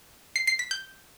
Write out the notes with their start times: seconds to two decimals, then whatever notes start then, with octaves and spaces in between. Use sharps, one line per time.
0.36 C7
0.47 C7
0.59 B6
0.71 G6